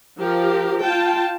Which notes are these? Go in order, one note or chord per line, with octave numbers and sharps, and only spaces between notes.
F3 G4 A#4
F4 G5 A5